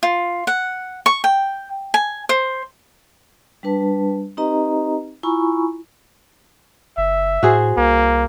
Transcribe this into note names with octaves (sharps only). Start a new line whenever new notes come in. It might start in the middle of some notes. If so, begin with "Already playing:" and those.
F4
F#5
C#6
G5
G#5
C5
G3 D4 B4 A5
C4 D#4 G4 B4 D#5 A#5
E4 F4 G#5 A#5 B5 C#6
F#1 E5
A2 F#4 G#4 C5
C2 A#3